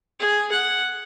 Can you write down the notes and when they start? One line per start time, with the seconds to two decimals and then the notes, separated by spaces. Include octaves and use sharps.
0.20 G#4
0.52 F#5